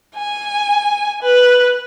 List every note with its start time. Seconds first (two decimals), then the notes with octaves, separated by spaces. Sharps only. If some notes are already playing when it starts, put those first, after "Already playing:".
0.16 G#5
1.23 B4